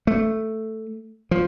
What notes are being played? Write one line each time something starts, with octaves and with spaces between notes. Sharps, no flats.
A3
F3